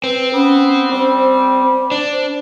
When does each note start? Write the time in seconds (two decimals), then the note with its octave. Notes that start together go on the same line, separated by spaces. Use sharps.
0.04 C4 B4
0.34 B3 C#4
0.91 G3 C5
1.92 D4